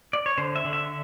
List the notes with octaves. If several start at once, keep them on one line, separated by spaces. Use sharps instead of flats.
D5
C#5
D3 C5
E5
D3
E5